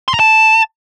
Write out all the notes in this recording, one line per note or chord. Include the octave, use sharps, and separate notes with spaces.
C6
A#5
A5